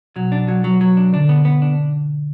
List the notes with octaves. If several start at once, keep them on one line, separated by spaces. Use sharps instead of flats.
B2 F#3
D4
F#3
F#3
F#3
D4
D3 D4
B3
B3
D4